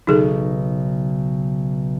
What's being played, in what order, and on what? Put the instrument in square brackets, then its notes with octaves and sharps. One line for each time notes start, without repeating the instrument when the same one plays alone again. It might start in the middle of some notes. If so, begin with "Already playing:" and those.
[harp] B1 C#3 [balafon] D#4 G#4 A4